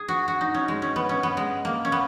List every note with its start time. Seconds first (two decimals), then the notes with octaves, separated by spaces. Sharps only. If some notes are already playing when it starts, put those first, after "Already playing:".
Already playing: G#4
0.08 F#4
0.28 F#4
0.41 D#4
0.54 C#4
0.68 G#3
0.82 C#4
0.96 B3
1.09 C#4
1.23 B3
1.37 G#3
1.65 A#3
1.85 C#4
1.92 B3